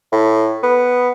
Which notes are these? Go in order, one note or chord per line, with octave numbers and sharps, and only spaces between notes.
A2
B3